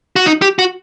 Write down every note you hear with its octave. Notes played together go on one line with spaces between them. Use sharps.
F#4
D#4
G4
F#4